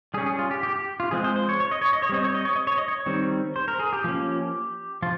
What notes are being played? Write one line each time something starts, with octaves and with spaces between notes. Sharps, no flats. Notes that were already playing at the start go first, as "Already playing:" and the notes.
G3 C#4 G#4
G#4
F4
G4
G4
G4
F4
F3 G#3 C4 G#4
C5
C5
C#5
C#5
D#5
C#5
D#5
C#5
G3 C4 D#5
C#5
D#5
C#5
D#5
C#5
D#5
C#5
D#3 G3 C4
C5
A#4
G#4
G4
F3 A#3 C#4
F3 F4